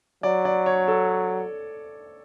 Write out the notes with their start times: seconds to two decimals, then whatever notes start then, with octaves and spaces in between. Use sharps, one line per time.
0.23 F#3 D5
0.45 D5
0.66 C#5
0.88 A4